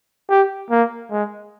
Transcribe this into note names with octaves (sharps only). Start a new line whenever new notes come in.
G4
A#3
G#3